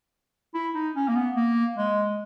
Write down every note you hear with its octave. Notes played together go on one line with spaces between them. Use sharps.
E4
D#4
C#4
A#3
B3
A#3
G#3